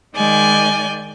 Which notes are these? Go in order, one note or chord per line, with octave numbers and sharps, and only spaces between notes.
D#3 G#3 D5 G#5 G6